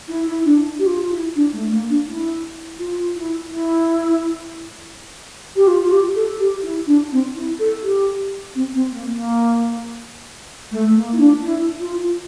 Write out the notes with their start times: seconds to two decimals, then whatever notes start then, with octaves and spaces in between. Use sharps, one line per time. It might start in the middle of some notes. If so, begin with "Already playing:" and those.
0.08 E4
0.27 E4
0.45 D4
0.79 G4
0.86 F4
1.11 E4
1.35 D4
1.53 A3
1.70 A#3
1.89 D4
2.07 E4
2.79 F4
3.15 E4
3.51 E4
5.56 G4
5.67 F4
5.84 F4
5.91 G4
6.15 A4
6.39 G4
6.63 E4
6.87 D4
7.12 C4
7.36 E4
7.59 A4
7.83 G4
8.55 C4
8.74 C4
8.92 A#3
9.09 A#3
10.72 A3
10.95 A#3
11.13 E4
11.19 D4
11.43 E4
11.80 F4